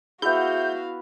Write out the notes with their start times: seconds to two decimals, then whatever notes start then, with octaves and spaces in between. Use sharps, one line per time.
0.22 B3 E4 F#4 G#4 E5 F5 G6